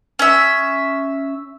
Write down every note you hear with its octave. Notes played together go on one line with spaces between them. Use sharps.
C#4 E5